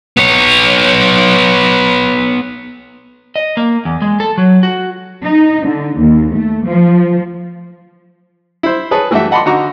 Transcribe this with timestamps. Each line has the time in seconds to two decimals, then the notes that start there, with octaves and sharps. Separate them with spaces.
0.17 B3 C#5
3.36 D#5
3.57 A#3
3.85 E2
4.02 G#3
4.20 A4
4.38 F#3
4.63 F#4
5.25 D#4
5.67 D3
5.98 D#2
6.34 A3
6.66 F3
8.63 E4 C5
8.91 G#4 B4 C#5 A5
9.11 E3 A3 F#4 G4 E5
9.31 D#5 F#5 A5 B5 C6 D6
9.46 D3 D#4 F#4 A#5 C#6 D6